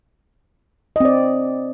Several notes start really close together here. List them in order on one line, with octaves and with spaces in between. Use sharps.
D#5 C4 D5